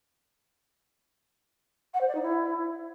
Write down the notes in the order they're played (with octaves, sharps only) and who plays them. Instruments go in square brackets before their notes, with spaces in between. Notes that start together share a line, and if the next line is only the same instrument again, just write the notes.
[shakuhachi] F#5
C5
D5
D#4
E4